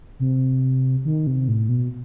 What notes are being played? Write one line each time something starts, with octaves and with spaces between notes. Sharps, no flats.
C3
D#3
C3
A2
B2